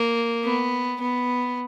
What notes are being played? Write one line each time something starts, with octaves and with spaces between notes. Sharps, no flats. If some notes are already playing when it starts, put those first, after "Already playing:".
Already playing: A#3
B3
B3